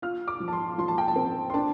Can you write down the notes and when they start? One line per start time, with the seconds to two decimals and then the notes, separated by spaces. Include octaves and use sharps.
0.02 F4 F6
0.28 D6
0.40 F3
0.48 A5
0.53 C6
0.78 F3 C6
0.88 A5
0.98 G5
1.08 A5
1.16 C4
1.50 C6
1.54 D4 A5